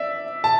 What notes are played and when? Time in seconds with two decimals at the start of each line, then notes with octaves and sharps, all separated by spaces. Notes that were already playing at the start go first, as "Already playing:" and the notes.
Already playing: D5 E5
0.44 A5